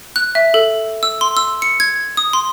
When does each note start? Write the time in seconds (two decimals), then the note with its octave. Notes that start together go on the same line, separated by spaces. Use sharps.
0.16 F#6
0.35 E5
0.54 A4
1.03 E6
1.21 C6
1.37 E6
1.62 C#7
1.80 G#6
2.17 D#6
2.33 C6